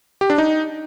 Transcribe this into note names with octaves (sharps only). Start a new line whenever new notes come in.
G4
D4
D#4